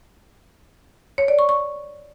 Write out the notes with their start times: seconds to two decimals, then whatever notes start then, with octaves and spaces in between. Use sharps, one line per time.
1.18 C#5
1.28 D5
1.39 C#6
1.49 C#6